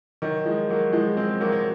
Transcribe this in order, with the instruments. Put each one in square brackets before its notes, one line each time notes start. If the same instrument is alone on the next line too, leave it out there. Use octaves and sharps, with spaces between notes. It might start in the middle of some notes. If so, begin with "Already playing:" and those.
[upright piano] D#3 F#3
F3 G#3
F#3 A#3
F3 G#3
G#3 C4
F#3 A#3
F#3